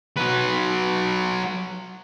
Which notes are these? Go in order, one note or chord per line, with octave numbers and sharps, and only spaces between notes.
F#3 B4